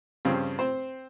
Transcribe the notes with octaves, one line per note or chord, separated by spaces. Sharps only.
G2 C#3 F3 C4
C4 C5